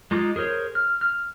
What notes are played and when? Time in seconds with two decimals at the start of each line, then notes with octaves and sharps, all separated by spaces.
0.11 G#3 D#4 F4 D6
0.36 G#4 A#4 C5 C#5
0.75 F6
1.01 F6